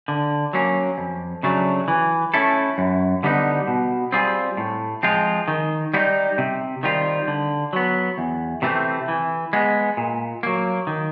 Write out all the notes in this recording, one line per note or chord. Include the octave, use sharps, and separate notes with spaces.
D3
F#3 A#3 C#4
F2
C#3 F#3 A3 D4
E3
A3 C#4 E4 A4
F#2
D3 G3 B3 D#4
B2
G3 C4 F4 G#4
A2
F3 G#3 C4 F4
D#3
G3 B3 D#4
C3
D#3 G3 C4 F4
D3
F#3 B3
E2
C3 E3 A3 C4
E3
G#3 B3
A#2
F#3 A#3
D#3